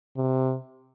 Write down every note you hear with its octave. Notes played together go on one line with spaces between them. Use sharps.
C3